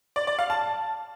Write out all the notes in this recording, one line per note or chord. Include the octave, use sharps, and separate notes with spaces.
D5
D5
F5
A5